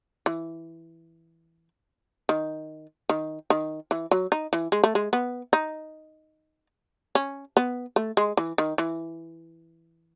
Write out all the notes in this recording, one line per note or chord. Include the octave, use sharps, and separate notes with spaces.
E3
D#3
D#3
D#3
E3
F#3
D#4
E3
G#3
A3
G#3
B3
D#4
C#4
B3
A3
G#3
E3
D#3
E3